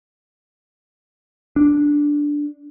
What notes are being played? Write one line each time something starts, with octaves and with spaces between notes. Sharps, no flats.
D4